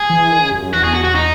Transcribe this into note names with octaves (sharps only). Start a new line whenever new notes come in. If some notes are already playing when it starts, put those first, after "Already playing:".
Already playing: G#4
E3
D#3
C#3
F#2
F#2
E2 F#4
G#4
F#4
F#4
D#4